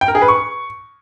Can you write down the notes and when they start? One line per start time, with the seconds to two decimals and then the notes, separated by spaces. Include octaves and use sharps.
0.01 G5
0.08 A#4
0.15 G#4
0.22 B4
0.28 C#6